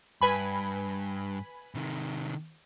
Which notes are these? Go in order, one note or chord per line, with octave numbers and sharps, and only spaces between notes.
G2 B4 G#5 B5
C3 D#3